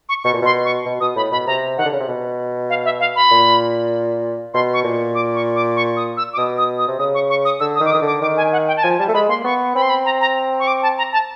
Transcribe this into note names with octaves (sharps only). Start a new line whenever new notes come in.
C#6
B2 C#6
A#2
B2 C6
C#6
B2
B2 D#6
A2 B5
B2 B5
C3 A#5
D#3 F#5
D3
C#3
C3
B2
F5
E5
F5
B5
A#2
B2 C6
C#6
A#2
D6
C#6
D6
C#6
D#6
E6
D6
B2 D#6
D#6
D#6
C3
C#3 D#6
C#6
C#6
D#6
D3 E6
D#6
D#3
D6
D#6
D#3
D3 D6
D#3 D6
G#5
F#5
G5
A5
F3 G#5
G3 A5
A3
G#3 B5
A#3 C6
B3 C#6
C4 B5
C6
B5
A#5
A#5
C#6
D6
A5
A#5
A5